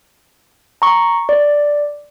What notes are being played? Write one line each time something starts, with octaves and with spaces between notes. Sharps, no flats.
A#5 C#6
D5